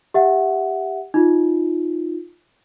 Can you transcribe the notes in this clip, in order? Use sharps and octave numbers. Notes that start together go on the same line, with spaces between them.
G4 E5 F#5
D#4 F4